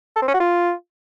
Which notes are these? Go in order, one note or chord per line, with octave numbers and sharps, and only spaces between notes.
A4
C4
C#4
F#4
F4